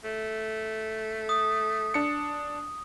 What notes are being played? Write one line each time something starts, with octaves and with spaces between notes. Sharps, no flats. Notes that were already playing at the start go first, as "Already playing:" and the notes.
A3
D#6
D4 C#7